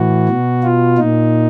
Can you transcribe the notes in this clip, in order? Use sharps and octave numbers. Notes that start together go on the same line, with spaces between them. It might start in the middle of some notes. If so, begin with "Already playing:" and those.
Already playing: A2 E3 F#4
B2
F4
A#2 D#4